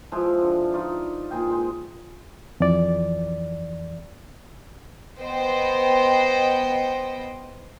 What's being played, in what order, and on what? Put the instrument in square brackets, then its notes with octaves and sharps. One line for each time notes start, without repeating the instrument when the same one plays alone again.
[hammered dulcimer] F3 G#3 E4 C5
D3
D#4 F4 D5 B5
A#2 G#4 G5
G#3 C5
[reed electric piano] F2 E3 D5
[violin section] B3 C5 D#5 G5